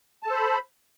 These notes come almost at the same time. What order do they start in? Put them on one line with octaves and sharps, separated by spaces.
A5 A4 C5 B5